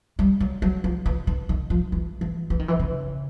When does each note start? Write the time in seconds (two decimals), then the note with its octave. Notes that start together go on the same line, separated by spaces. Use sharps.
0.19 G3
0.40 F#3
0.62 F#3
0.84 F3
1.06 E3
1.27 D#3
1.49 D#3
1.70 F3
1.92 E3
2.21 E3
2.50 E3
2.59 D#3
2.68 E3
2.79 C#3